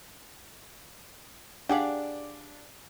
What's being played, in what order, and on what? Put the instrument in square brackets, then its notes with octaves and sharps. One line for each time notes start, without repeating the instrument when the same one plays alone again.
[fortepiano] D4 [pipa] G4 G#4 D5 [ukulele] F5 F#5